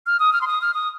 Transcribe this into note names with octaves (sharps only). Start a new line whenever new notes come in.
F6
D#6
F6
C6
D#6
F6
D#6